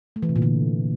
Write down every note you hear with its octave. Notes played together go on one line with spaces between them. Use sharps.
A3
E3
C3
A#2
D3